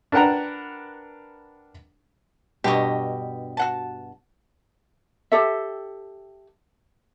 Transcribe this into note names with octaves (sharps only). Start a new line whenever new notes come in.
D4 A#4 B4 F#5 G5 A#5
G2 B2 D3 G4 D#5 C#6
F#4 F#5 A5
G4 A4 E5